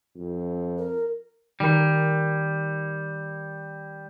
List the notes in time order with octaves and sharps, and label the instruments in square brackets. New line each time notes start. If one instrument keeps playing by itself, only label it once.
[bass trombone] F2
[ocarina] A#4
[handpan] D#3 A#4 [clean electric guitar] G3